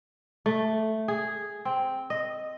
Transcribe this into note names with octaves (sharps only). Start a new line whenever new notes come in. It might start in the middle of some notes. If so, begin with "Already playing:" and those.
A3
G#4
C4
D#5